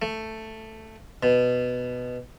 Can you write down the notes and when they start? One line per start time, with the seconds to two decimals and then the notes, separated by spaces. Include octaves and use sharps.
0.02 A3
1.23 B2